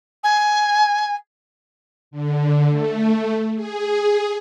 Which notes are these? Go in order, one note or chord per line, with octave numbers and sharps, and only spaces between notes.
G#5
D3
A3
G#4